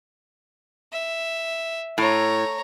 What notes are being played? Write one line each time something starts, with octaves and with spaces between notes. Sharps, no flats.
E5
A2 C#5 A#5